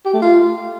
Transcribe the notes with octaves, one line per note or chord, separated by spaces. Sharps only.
G4
A3
F4